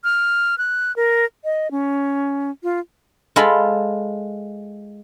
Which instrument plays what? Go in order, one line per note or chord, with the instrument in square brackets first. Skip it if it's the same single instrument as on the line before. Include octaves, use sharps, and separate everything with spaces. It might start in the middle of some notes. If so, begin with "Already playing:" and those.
[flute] F6
F#6
A#4
D#5
C#4
F4
[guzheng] G#3 F4 A4 B5